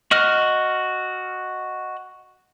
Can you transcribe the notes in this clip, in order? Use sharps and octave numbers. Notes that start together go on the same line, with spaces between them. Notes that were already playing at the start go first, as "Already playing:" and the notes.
F#4 D#5 F6 F#6